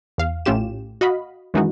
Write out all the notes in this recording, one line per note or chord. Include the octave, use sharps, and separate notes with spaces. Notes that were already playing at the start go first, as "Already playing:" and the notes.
E2 F5
A#1 A2 C#4 F4 G4 E7
F#4 D#5 F5 B5
F#2 D#3 E3 G#3 D#4 F#4